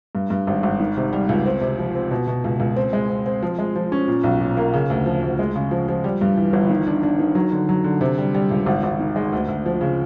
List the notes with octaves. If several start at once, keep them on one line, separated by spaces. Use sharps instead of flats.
G2
G2
G#1
G#1
D#3
C3
G3
C#2
C4
C3
F3
C4
B2
B2
C#2
C#2
C4
G#3
C4
C4
F3
G#3
F3
C#4
A#2
B1
A#2
A#3
C#3
D2
F3
D2
G#3
C#3
F3
F3
G3
G2
E3
G1
D#3
D4
D4
D#3
F#3
D3
F#3
D3
C3
G3
G3
C#2
G#1
G#1
D#3
G#3
D2
D2
F3
C#3